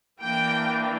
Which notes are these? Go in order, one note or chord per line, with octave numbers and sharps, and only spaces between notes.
E3 A#3 D4 G5